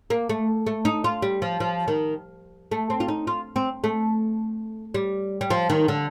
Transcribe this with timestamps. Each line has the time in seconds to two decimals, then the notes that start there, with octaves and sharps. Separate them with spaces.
0.10 A#3
0.29 A3
0.66 A3
0.85 D#4
1.04 F4
1.22 G3
1.42 F3
1.60 F3
1.88 D#3
2.71 A3
2.90 C4
3.00 F4
3.08 D#4
3.27 F4
3.56 C4
3.84 A3
4.94 G3
5.41 G3
5.50 F3
5.70 D#3
5.88 D3